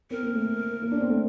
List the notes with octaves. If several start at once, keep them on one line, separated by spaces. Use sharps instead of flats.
C4 A#4
A#3
A3
A#3
D4
C4
A3